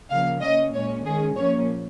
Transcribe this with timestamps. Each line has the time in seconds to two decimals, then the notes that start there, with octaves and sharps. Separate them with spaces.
0.10 C#3 F3 A#3 F5
0.42 C#3 A#3 C#4 D#5
0.73 A#2 G#3 C#4 C#5
1.05 D#3 G#3 C#4 G#4
1.36 A#2 F3 A#3 C#4 C#5